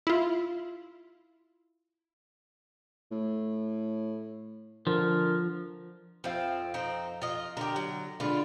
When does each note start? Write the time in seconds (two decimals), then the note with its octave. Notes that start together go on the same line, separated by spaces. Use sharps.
0.07 E4 F4
3.12 A2
4.87 D3 F3 A#4
6.24 F2 F3 C4 F5
6.74 C4 D#4
7.22 F4 D#5
7.57 D3 G4 A#4
7.76 F#3
8.20 D3 G#3 D4 F4 B4